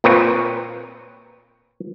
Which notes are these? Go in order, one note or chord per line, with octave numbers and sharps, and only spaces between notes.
A#2 C4 A#4 B4 C#5